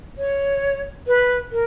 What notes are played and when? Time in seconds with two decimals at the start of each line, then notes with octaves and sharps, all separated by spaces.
0.18 C#5
1.07 B4
1.52 A#4